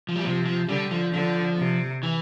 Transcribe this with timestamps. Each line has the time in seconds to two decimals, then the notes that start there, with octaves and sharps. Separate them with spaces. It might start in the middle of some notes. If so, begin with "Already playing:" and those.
0.09 F3
0.16 G3
0.24 C3 F3
0.46 F3
0.68 D3 G3
0.91 F3
1.13 D3 F3
1.58 C3
2.03 E3